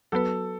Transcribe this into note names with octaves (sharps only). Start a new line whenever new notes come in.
F#3 B3 F#4 A4 B4